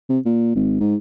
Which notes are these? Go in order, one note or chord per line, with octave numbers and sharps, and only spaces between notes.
C3
A#2
G#1
G#2